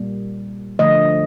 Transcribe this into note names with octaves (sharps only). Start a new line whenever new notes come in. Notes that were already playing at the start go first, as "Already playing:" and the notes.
Already playing: A#2 G3 A#3
D3 F3 A3 D#5